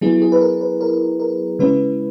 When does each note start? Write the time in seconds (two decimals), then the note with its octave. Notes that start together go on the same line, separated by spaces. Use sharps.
0.01 F#3 B3 E4 G#4
0.22 G#4
0.32 B4
0.41 A#4
0.61 B4
0.81 A#4
1.20 A#4
1.59 C#3 G#3 C#4 E4 B4